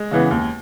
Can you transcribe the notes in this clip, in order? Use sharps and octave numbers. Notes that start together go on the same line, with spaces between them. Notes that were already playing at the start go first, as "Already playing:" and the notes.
Already playing: G#3
C#3 E3 B3
D#2